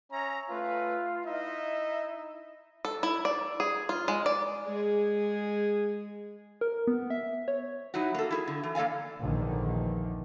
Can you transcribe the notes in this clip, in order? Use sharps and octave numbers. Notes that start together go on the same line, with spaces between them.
C#4 E5 A#5
A3 F4 B4
D#4 E4 D#5 E5
A4
E4
D5
G#4
F4
G#3
D5
G#3 G#4
A#4
B3
E5
C#5
F#3 D#4 E4 F#4
A#3 A4
E4 G4 G#4
D3
E3
A#3 A4 D5 F5 G#5
A#1 E2 D3 D#3